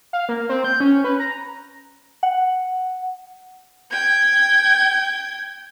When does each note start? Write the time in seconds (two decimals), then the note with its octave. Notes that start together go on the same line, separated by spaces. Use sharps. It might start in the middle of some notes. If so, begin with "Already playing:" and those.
0.13 F5
0.29 A#3
0.49 C4
0.64 G6
0.80 C#4
1.04 B4
1.20 A#5
2.23 F#5
3.90 G5 G#6